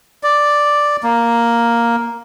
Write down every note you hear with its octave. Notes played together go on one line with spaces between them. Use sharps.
D5
A#3